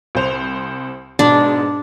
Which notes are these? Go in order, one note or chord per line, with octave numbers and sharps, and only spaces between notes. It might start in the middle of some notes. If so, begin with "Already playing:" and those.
C2 C5 F7
G#2 B2 D4